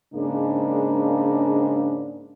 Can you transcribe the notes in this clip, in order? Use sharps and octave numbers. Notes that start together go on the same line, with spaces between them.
G#2 C#3 G#3 A#3 D4